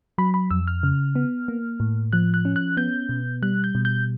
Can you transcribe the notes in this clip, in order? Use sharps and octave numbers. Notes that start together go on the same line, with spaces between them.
F#3 B5
B5
F2 E6
F6
C#3
B3
A#3
A2
F3 F#6
F#6
C#4
F#6
B3 G6
B2
G3 F#6
G6
B2
G6